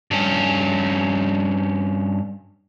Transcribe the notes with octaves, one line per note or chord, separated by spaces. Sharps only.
G2 C#4